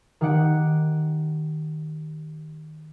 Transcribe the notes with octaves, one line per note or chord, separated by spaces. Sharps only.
D#3 G4 F#5 D7